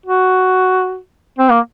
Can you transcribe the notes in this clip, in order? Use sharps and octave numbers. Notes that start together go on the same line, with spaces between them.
F#4
C4
A#3